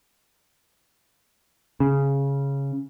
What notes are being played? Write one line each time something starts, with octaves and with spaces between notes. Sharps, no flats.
C#3